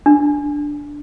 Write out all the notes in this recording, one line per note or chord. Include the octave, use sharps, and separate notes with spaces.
D4